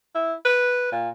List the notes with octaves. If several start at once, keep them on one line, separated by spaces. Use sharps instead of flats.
E4
B4
A#2